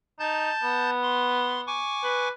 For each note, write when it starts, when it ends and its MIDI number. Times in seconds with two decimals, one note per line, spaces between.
0.19 0.51 63
0.19 0.90 81
0.19 0.90 91
0.19 0.90 93
0.63 1.81 59
1.02 1.61 84
1.67 2.29 80
1.67 2.29 85
1.67 2.29 86
2.03 2.30 71